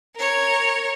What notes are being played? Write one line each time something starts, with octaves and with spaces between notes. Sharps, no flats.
A#4 C#5